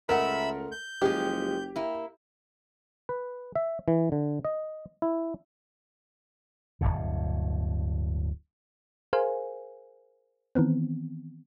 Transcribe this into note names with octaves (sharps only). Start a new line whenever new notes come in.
C#2 G#3 A3 A#4 E5 F#5 B5 E6
G6
F#1 F3 G#3 G4
A#3 E4
B4
E5
E3
D3
D#5
E4
D1 G1 G2 B2
G#4 A#4 C5 F5 G#5
D#3 E3 B3 C4